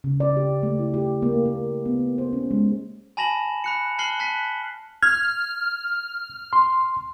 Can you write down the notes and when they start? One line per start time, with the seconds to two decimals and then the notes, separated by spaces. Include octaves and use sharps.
0.04 C#3
0.20 D5
0.37 G4
0.63 A3
0.79 E4
0.94 G4
1.22 A#3
1.45 A#3
1.86 B3
2.18 C5
2.33 C#4
2.51 G#3
3.17 G#5 A5 B5 A#6 E7 F#7
3.64 B5 F#6 C#7
3.99 A5 F6 F#6 C7 F#7 G7
4.20 A5 F#6 B6 C7
5.03 F6 G#6
6.53 C6